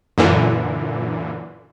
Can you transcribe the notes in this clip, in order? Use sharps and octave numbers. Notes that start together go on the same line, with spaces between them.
F#2 A#2 D3 E3